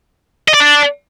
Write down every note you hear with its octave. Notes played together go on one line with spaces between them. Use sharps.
D#5
D5
D4